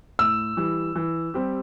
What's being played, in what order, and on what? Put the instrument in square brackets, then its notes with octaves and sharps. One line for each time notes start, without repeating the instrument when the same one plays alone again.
[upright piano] A2 [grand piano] E6
[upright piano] E3 G3
E3
G3 C4 G4